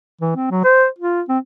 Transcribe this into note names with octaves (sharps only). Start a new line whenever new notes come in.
E3
C4
F#3
C5
F4
C4